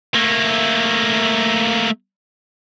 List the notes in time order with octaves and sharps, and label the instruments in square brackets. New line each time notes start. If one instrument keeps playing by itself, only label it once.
[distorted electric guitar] A3 A#3